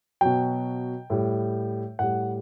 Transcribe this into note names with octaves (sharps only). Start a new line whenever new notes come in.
B2 F#3 G5
A2 G3
A2 G3 F#5